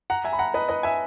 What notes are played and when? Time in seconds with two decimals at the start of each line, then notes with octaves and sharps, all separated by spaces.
0.10 F#5 A#5
0.24 E5 G#5
0.33 B5
0.39 F#5 A#5
0.54 B4 D#5
0.68 B4 D#5
0.83 E5 G#5